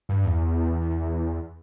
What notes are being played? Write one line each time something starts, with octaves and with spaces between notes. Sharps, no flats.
G2
E2